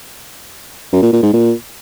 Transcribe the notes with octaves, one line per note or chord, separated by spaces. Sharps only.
F#2
A#2
A#2
G#2
A#2